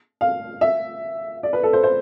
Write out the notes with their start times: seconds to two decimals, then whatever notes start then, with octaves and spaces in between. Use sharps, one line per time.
0.21 F5
0.61 E5
1.43 D5
1.53 B4
1.63 A4
1.73 C5
1.83 C5